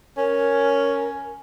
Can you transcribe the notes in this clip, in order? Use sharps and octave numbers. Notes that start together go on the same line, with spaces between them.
C#4 A#4